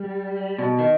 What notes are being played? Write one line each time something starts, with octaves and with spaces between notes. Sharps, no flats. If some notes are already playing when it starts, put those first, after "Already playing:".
Already playing: G3
B2
D#3